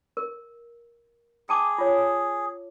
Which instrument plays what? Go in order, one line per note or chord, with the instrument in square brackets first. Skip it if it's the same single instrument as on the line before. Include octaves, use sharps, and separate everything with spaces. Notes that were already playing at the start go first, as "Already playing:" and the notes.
[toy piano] A#4
[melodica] G#4 [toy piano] G5 A5 D6
[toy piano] F4 C#5